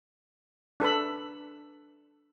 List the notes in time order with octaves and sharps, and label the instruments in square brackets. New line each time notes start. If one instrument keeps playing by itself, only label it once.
[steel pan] D4 A4 B4 B5